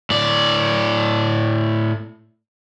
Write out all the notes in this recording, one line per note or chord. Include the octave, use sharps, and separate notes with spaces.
A2 D5